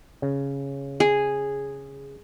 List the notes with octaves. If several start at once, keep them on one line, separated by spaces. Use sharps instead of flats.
C#3
G#4